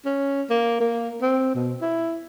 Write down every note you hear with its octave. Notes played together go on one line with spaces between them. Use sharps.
C#4
A#3
A#3
C4
B2
E4